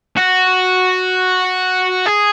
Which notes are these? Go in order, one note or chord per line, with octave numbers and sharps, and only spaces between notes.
F#4
G#4